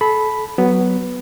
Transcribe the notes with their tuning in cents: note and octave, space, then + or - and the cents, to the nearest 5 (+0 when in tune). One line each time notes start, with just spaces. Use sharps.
A4 -30 B5 +0
F#3 +15 B3 +0